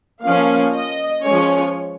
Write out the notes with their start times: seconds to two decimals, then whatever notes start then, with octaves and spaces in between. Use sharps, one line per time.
0.24 F3 A#3 C#4 F5
0.74 D#5
1.24 F3 G#3 C#4 C#5